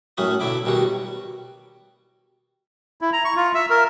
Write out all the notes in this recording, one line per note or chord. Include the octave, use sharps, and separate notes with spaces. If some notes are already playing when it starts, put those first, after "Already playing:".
F#2 A2 F#3 C#4 B5 D#6
B1 D3 F#3 E4 B5 D6
B2 D#3 G3 F#4
E4
A#5
C#6
F4
E5
A#4